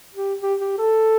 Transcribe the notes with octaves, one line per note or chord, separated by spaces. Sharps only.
G4
G4
G4
A4